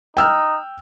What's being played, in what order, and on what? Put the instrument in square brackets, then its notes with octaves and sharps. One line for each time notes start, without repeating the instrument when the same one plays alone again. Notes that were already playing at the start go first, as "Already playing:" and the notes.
[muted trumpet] D#4 [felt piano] G5 E6 F6